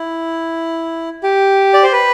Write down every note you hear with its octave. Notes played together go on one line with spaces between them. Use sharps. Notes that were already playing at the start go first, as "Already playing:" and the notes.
Already playing: E4
G4
D5
C5
B4